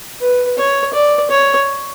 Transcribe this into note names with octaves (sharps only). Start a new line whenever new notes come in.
B4
C#5
D5
C#5